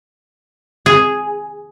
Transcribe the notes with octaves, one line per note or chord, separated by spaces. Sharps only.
G#4